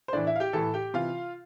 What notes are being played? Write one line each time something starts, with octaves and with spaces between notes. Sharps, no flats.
C5
A2 E3 D4 D5
E4 E5
F5
G4 G5
A2 E3 A4 A5
G4 G5
C3 E3 F4 F5